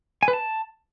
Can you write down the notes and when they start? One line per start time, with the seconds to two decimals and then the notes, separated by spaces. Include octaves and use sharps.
0.23 G#5
0.28 B4
0.33 A5